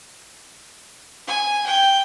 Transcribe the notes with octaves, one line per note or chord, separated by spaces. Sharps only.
G#5
G5